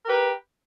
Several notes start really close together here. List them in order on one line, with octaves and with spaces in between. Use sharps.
A#4 G4 B4